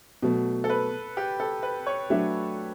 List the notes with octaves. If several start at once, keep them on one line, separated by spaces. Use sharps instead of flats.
B2 F#3 A3
A4
B4
G4
A4
B4
C#5
F#3 A3 D4 A4 E5